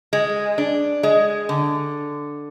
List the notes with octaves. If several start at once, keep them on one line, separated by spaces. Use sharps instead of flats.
G#3
D4
G#3
D3